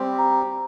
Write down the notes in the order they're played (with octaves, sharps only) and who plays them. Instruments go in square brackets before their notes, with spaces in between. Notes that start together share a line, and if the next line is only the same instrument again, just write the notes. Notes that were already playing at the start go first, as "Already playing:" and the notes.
Already playing: [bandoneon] G3 C4 G4 [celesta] C6
[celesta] A#5